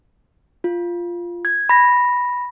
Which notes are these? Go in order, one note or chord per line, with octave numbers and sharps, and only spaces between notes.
F4
G#6
B5 A#6